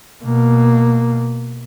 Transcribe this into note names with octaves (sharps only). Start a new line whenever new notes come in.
B2 A#3